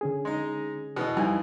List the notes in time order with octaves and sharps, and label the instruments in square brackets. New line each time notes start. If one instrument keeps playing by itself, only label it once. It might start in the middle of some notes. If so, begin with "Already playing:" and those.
[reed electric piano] D3 C#4 G#4
[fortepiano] G#3 D#4
B2 E3 D#5
[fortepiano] F2 E3 [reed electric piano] G3 D#4 G#5